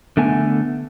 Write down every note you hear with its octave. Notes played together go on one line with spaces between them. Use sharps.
D3 A3 B3 G#5